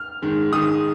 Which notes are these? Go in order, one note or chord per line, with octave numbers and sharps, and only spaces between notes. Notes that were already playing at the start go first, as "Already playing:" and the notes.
Already playing: F6
G#2 D#3 G#3
G#2 D#3 G#3 D#6